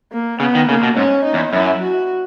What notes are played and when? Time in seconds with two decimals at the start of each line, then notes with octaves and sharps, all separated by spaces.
0.12 A#3
0.40 C#3 B3
0.55 D#3
0.69 C#3 A#3
0.83 B2
0.97 G#2 C#4
1.25 D#4
1.34 E2
1.53 F#2 E4
1.81 F#4